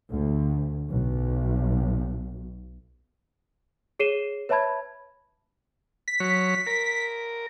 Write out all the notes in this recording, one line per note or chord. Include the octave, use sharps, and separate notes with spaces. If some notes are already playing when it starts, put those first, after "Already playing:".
D2
B1
G#4 C#5 C7 D#7 E7 G7
B4 C#5 E5 A5 B5 G#6
B6
F#3 C#5
A#4